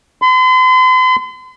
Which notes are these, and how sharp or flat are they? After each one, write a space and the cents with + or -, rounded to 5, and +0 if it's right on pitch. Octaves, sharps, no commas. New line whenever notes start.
C6 -45